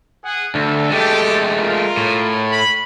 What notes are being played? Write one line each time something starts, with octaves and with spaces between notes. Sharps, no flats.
G#4 F#5
D2 A4
G#3 A3 G4 A4
F4 A#4
A2
B5